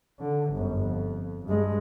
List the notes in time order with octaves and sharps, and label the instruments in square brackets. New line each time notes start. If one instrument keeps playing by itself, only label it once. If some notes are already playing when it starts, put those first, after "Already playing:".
[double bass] D3
G1 F#2
F2
G2 G#3